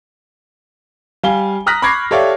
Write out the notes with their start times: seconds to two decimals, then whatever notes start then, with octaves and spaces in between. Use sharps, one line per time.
1.23 G3 F5 G#5 G7
1.66 A#5 D#6 F6 F#6 A#6 B6
1.82 B5 C#6 D6 G#6 A#6 C7
2.11 G4 A4 C#5 D5 E5 F5